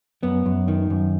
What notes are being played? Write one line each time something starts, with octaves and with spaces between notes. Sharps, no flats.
F#2 B3
F#2
D#3
F#2